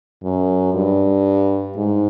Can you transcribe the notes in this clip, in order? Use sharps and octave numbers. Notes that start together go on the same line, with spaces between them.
F#2
G2
G#2